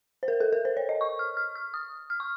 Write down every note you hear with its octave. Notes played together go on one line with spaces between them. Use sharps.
C5
A#4
A4
A#4
C5
C#5
D#5
C#6
F6
F6
F6
D#6
F6
C#6